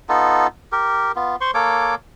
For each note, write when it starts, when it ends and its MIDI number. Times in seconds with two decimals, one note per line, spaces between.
0.09 0.47 59
0.09 0.47 63
0.09 0.47 65
0.09 0.47 69
0.72 1.12 67
0.72 1.12 70
1.16 1.36 59
1.16 1.36 65
1.41 1.51 72
1.41 1.51 84
1.41 1.51 85
1.54 1.95 58
1.54 1.95 69
1.54 1.95 73
1.54 1.95 86